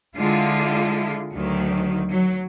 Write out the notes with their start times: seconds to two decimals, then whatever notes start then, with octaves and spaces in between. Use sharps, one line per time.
0.14 D3 G#3 E4 F4
1.34 D2 D#3 F#3
2.10 F#3